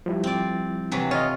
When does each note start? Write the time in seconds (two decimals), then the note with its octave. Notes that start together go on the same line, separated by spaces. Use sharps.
0.06 F3 G3 E4
0.24 C4 D5
0.91 C3 E3 F#3
1.11 F4 C#5 D#5